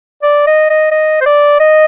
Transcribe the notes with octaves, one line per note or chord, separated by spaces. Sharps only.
D5
D#5
D#5
D#5
C5
D5
D#5